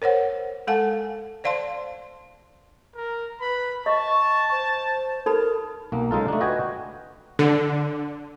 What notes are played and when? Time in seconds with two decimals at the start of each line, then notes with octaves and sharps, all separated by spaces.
0.02 A#4 C5 C#5 F#5
0.67 G#3 A4 F5 F#5 G#5 A5
1.44 C5 D5 F5 A5 C6
2.96 A#4
3.40 B4 B5
3.86 D#5 A5 C#6
4.51 C5
5.26 D#4 A4 A#4 B5
5.92 B1 A#3
6.11 C#3 G#3 D#4 F4 A4
6.28 A3 D4
6.41 F#4 B4 D#5 G5 G#5
7.39 D3